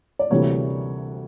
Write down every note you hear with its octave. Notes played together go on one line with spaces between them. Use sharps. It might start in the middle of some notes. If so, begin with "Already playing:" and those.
D5
D2 C3 E3 G3 A#3 C#5